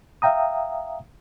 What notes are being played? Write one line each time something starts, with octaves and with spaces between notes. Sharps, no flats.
E5 F5 G5 A#5 D#6